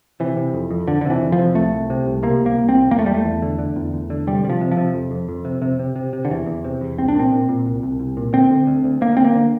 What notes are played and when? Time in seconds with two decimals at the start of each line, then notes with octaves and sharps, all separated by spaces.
0.20 C3 E3
0.37 C3
0.54 F2
0.71 F2
0.88 F2 D3
1.01 D3
1.05 C3 E3
1.22 F2
1.32 F3
1.39 C3
1.55 C2 A3
1.73 C2
1.90 C3
2.06 C2
2.23 C3 A#3
2.41 C2
2.46 A#3
2.57 C2
2.69 C4
2.75 C2
2.91 E2 A#3
2.99 A3
3.06 E2 G3
3.14 A3
3.24 E2
3.42 D3
3.59 D3
3.76 E2
3.93 E2
4.10 D3
4.27 C3 G3
4.44 C3 G3
4.50 F3
4.61 C3
4.71 F3
4.77 C3
4.94 F2
5.11 F2
5.29 F2
5.45 C3
5.62 C3
5.79 C3
5.96 C3
6.13 C3
6.25 D3
6.30 E2 E3
6.46 E2
6.64 C3
6.81 E2
6.98 C2 C4
7.08 D4
7.15 A#2 C4
7.32 A#2
7.49 A#2
7.66 C2
7.83 C2
8.00 C2
8.17 A#2
8.33 D2 C4
8.51 D3
8.67 D2
8.84 D2
9.01 D2 A#3
9.17 D2 C4
9.24 A#3
9.35 D3